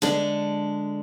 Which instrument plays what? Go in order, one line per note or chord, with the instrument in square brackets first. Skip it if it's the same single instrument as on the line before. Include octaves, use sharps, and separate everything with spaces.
[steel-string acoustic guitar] D3 G#3 D4